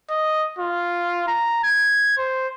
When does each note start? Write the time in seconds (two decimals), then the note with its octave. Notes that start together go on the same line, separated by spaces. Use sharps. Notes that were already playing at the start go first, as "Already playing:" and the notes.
0.11 D#5
0.59 F4
1.28 A#5
1.64 G#6
2.18 C5